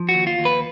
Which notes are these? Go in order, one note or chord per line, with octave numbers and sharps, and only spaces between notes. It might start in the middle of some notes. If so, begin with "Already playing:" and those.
Already playing: F3
F#4
D#2
F4
D#2
B4